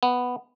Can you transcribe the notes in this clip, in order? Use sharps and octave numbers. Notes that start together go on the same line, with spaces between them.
B3